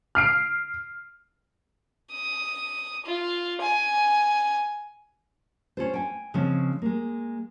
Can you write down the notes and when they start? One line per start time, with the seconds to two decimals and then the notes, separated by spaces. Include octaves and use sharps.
0.15 F6 C7 D7
2.13 D#6
3.05 F4
3.61 G#5
5.77 C#4 F4 C5
5.94 G5 G#5
6.34 C#3 F3 G#3 C4 C#4
6.82 G#3 A#3